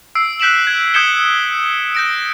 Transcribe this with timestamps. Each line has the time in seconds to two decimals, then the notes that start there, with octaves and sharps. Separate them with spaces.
0.15 E6 C7 D7
0.40 F#6 G6 B6 D7 E7 F#7
0.67 G#6
0.94 D#6 G6 G#6 C#7 E7 G7
1.95 G6 A#6 D7